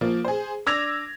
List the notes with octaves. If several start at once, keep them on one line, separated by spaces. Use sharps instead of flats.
F3 A#3
G#4 C5
D4 D6 E6 G#6 A#6 F7